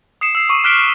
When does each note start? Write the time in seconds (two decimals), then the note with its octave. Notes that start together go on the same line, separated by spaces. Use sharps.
0.21 D#6 C7 C#7 E7
0.35 E6 C7
0.49 C#6 D6 D#7
0.64 D6 F6 F#6 B6 D7 G7
0.77 D7